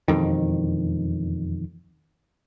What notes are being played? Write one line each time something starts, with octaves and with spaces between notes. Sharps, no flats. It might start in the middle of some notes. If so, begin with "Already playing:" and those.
E1 A1 F2 D#3